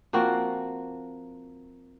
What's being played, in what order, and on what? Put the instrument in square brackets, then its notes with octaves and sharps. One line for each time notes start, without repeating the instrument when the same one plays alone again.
[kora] F3 A#3 C4 F#4